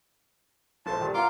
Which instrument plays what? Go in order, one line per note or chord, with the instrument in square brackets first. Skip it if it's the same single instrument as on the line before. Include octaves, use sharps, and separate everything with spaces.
[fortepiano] A#1 [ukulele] F4 A4 C5 [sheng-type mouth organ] A5
[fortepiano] A#2 D#3 G3
[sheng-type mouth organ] F4 C6 D6 [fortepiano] A#4 C#5 [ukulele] F#5 A#5